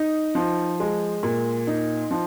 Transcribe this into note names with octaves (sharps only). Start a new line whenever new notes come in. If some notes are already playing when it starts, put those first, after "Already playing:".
Already playing: D#4
F3
G#3
A#2
D#4
F3